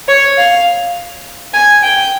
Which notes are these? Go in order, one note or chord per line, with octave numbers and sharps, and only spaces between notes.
C#5
F5
G#5
G5